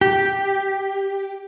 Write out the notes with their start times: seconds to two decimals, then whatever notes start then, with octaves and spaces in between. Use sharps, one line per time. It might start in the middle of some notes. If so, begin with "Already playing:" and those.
0.01 G4